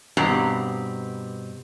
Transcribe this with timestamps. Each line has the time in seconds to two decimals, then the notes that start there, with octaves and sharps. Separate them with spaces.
0.17 G2 B2 C4 G4 A#5